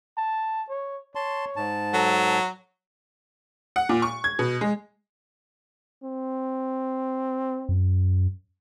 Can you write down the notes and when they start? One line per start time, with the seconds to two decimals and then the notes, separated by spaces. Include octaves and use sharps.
0.18 A5
0.69 C#5
1.15 C#5 A5 C6
1.56 G#2 A5
1.94 F#3 A4
3.76 F#5
3.89 A#2
4.02 C#6
4.24 G#6
4.39 B2
4.61 G#3
6.03 C4
7.69 F#2